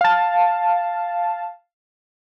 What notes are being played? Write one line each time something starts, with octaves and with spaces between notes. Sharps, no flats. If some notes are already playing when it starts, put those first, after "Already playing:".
F5 A5